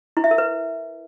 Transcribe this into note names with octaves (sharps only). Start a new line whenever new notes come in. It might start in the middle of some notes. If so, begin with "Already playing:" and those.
E4
E5
A#4
B4